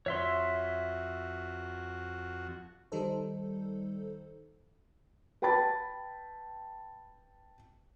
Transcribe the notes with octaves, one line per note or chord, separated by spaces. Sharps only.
F2 F#4 C#5 E5 C6
D#3 G3 D#4 A4 C5
B4 G5 A5 B5 A6